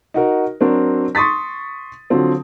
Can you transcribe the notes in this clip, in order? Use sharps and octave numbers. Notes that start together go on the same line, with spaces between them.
D#4 F#4 A#4
F#3 C4 D4 F#4 A#4
C6 C#6 D#6 A6 B6
D3 F3 F#3 C4